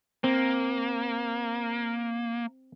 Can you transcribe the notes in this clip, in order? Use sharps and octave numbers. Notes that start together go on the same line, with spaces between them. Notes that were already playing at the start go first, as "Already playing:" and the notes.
A#3 C4